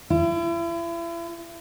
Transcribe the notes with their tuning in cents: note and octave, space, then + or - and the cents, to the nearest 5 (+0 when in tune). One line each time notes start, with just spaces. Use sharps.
E4 +40